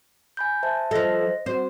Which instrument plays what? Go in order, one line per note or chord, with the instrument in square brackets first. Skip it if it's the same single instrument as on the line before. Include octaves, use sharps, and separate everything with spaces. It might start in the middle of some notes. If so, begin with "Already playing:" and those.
[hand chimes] G#5 B5 G6
C5 E5 A5
[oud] F3 A4 [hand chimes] C5 D#5 A#6
[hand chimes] C4 F#4 [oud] C5